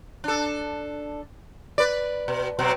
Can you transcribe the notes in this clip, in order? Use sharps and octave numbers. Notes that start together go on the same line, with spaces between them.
D4 A4
B4 D5
B2
B2 F#3 C4